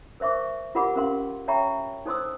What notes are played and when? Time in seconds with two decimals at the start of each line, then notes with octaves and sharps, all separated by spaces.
0.20 A#4 C5 E5 C#6 D6
0.75 F4 G4 A#4 F#5 B5 D6
0.96 C#4 G4 A#4 F5 C6
1.48 C#5 E5 G5 A#5 B5 C#6
2.06 D#4 A4 C5 C6 D#6 E6